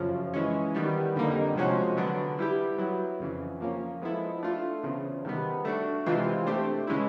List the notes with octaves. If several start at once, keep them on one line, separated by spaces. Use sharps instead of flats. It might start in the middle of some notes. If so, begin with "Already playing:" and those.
Already playing: F#2 C#3 F3
E3 G#3 C#4
D#3 G3 B3
F2 D3 G3 A#3 D#4
C3 F3 G#3 C#4 F#4
D3 F#3 B3 D4
G3 B3 E4 G4
F#3 B3 E4
F2 C#3 E3
F3 A#3 C#4
F3 G#3 B3 E4 A4
A3 D4 F4
E2 C#3 F3
C3 D#3 G3 B3
A3 D4 F#4
C3 E3 G#3 C4 F4
A3 D4 G4 C5
C#3 E3 G#3 C#4 E4